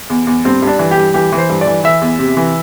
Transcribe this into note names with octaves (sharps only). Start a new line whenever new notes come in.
E2
E2
G2 C4
G2
D4
E3
G4
G2
E3 G4
E3
C5
G2
D5
E3
E3 E5
E2
C3
E3